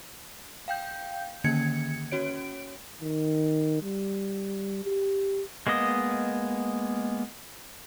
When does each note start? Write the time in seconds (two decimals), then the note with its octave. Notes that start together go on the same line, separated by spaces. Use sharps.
0.68 F5 G5 G6
1.44 D3 D#3 A#3 C#4 G#6 C#7
2.11 C#4 F#4 C#5 D7
3.02 D#3
3.82 G3
4.85 G4
5.67 G#3 A#3 B3 D#5